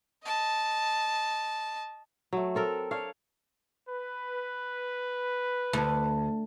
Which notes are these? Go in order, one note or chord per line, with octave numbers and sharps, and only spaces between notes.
D#5 A5
F#3 A3
C4 A4 A#4
D4 C#5 F5
B4
D2